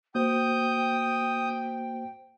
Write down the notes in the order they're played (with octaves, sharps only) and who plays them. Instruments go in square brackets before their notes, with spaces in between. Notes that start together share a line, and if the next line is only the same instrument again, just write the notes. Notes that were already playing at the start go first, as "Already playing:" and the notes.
[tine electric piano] A#3 F#4 C5 [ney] G5 [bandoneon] D#6 G6